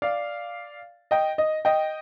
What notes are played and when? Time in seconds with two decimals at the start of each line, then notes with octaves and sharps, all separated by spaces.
0.02 D5 F5
1.11 D#5 G5
1.38 D#5
1.65 D#5 G5